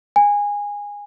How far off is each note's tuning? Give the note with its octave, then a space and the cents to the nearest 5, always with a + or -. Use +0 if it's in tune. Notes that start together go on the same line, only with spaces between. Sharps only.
G#5 -20